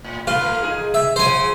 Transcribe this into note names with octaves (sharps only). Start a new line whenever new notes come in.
A2
A3 F4 B4
A3 A#3
D#4 G#4
E5
C#3 F3 C5 G#5